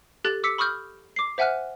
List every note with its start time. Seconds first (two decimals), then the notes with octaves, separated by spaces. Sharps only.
0.25 G4 A4 F#6 A6
0.44 D6 E6 B6 C#7
0.58 B5 C#6 D#6 F6 G6
1.16 D6 C7
1.38 C5 E5 F#5 G#5 F6 F#6